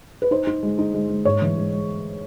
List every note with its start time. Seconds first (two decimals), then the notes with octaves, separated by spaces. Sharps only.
0.22 B4
0.31 D#4 C5
0.47 D#4
0.63 G#3
0.79 D#4
0.94 G#3
1.09 G#3
1.25 G#2 C#5
1.42 E3
1.57 G#3
1.73 G#3